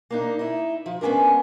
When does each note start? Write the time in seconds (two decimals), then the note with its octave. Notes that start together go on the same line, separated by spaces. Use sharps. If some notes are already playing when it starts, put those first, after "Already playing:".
0.11 A#3 D4 D#4
0.39 D#4 E4
0.86 F3
1.01 G#3 B3 C#4 D4 A#4